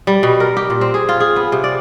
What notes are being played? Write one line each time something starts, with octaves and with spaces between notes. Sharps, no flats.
G3
B2
A#4
G4
A#2
C4
G#4
F4
G#4
B3
C3
D5